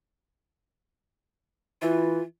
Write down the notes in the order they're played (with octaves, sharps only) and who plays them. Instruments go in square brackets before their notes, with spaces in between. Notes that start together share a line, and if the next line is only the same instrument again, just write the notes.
[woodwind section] E3 [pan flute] F4